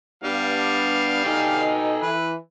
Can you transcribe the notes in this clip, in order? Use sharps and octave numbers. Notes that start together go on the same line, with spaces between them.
G2 G3 B3 D4 F5
B2 D#4 A4 G5 G#5
E3 B4